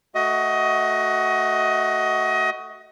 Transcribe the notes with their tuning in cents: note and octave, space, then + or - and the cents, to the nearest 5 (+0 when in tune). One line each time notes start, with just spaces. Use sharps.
A3 +0 F#4 +10 D#5 +20